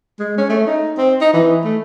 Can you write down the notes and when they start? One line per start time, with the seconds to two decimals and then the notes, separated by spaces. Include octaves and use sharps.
0.19 G#3
0.38 C#4
0.50 A3
0.67 D#4
0.97 C4
1.21 D#4
1.33 E3
1.64 A3